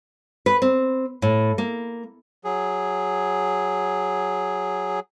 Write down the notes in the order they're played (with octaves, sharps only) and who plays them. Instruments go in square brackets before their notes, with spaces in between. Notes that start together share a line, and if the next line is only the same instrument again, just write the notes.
[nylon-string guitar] B4
C4
A2
A#3
[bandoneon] F#3 G#4